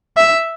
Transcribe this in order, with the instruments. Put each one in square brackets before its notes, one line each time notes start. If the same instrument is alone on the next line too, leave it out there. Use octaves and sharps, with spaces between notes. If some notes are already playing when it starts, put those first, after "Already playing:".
[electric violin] E5